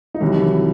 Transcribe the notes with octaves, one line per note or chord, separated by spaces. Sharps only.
D#4
C2 C3 D#3 E3 F#3 E4